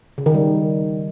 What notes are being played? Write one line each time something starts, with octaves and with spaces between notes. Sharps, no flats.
C#3
D#3
G3